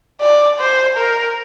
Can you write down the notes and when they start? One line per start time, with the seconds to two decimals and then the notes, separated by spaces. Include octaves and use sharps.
0.21 D5
0.60 C5
0.98 A#4